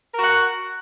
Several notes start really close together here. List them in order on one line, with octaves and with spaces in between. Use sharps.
A#4 F#4 F#5